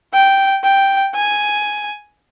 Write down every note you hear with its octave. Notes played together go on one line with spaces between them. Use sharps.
G5
G5
G#5